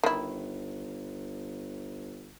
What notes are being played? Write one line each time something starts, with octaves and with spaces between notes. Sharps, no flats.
G1 D#3 E4